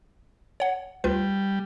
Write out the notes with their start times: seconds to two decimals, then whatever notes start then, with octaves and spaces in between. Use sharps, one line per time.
0.60 C#5 F#5
1.04 D2 G3 F4 B4